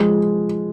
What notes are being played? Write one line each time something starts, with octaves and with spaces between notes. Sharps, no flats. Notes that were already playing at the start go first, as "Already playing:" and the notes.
Already playing: F3 G#3